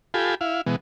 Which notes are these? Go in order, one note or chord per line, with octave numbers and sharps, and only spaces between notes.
F4 G4 A4 G#5 B5
E4 F5
B2 E3 G#3 B3